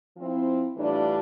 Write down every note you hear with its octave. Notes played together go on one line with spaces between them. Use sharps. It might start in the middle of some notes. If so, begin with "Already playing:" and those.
F3 C4 E4
A2 E3 G3 D4 F4